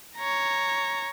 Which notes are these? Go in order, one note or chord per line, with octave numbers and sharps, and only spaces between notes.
C#5 A#5